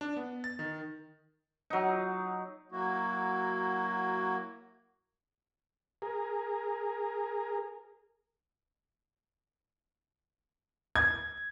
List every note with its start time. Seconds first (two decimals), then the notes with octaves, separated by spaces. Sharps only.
0.01 D4
0.17 B3
0.44 A6
0.59 D#3
1.70 F#3 D#4
2.72 F#3 A#3 E4 F#4
6.02 G#4 A#4
10.96 G#6